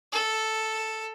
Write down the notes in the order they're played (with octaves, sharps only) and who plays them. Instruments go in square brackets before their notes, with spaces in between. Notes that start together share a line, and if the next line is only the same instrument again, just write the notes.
[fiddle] A4